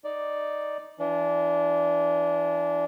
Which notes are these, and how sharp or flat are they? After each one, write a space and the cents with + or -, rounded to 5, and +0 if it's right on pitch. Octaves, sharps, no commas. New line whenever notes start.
D#4 +0 D5 +0
E3 +20 D4 -20